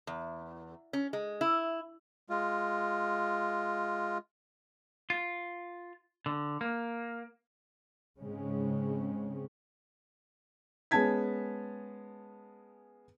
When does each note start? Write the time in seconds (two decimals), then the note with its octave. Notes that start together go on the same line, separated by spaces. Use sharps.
0.07 E2
0.93 C#4
1.13 G#3
1.41 E4
2.30 G#3 F4
5.10 F4
6.26 D3
6.61 A#3
8.20 G#2 C#3 G#3 C4 C#4
10.91 G#3 B3 C#4 A5 G#6 B6